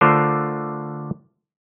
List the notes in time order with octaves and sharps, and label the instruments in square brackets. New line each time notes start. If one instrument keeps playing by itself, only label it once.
[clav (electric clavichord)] D3 A3 D4 F4 A#4 C5